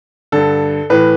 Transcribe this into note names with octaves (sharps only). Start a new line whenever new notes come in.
G2 D3 A4
A2 E3 B4